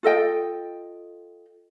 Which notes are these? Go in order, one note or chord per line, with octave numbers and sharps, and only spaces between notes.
F4 A4 D#5 G5